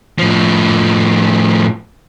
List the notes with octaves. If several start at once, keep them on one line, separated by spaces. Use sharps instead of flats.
A2 F3